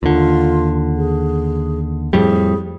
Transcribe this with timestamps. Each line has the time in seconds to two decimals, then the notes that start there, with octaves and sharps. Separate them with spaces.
0.03 D#2 D3 F4
0.97 G#4
2.13 F2 A2 G3 G#4